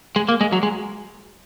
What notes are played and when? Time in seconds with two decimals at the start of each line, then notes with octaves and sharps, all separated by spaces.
0.16 G#3
0.29 A#3
0.41 G#3
0.53 F#3
0.63 G#3